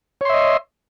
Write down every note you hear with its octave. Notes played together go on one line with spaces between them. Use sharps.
C#5 D#5 E5 C6